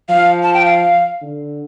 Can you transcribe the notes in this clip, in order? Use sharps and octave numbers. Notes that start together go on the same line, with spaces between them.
F3 F5
A5
G5
F5
D3